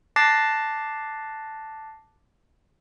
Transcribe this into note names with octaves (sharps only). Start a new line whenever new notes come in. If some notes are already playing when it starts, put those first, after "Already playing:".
A5 D6 F#6 A6 A#6 C7